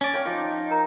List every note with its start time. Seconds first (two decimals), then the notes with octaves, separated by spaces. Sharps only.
0.01 C#4 D5
0.13 C#5 F5 G5
0.25 F3 D#4 D6
0.71 A#4 A#5